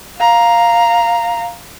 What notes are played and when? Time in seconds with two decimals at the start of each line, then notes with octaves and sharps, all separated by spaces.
0.18 F5 A#5